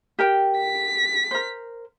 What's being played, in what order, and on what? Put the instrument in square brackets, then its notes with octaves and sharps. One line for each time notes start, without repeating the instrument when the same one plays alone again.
[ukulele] G4 A#4 G5
[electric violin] B6
[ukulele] A#4 C5